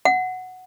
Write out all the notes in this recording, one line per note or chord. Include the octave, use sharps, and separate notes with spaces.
F#5